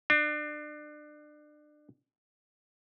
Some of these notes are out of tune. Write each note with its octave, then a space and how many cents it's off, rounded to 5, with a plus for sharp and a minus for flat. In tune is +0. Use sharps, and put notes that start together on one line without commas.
D4 +30